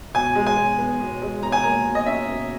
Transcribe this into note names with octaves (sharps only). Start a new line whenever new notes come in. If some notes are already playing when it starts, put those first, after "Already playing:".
B2 G#5
G#3
G#5
B2
B3
B2
G#3
B2 A#5
G#5
A#3 A#5
B2
D#5
C#4 E5
B2